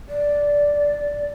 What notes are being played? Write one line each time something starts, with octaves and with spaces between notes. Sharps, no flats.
D5